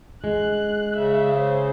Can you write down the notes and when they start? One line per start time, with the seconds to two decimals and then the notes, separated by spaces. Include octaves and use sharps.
0.24 G#3 F#6
0.96 C#3 E5
1.39 C5